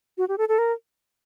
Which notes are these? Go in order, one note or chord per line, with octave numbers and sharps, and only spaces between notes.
F#4
G4
A4
A4
A#4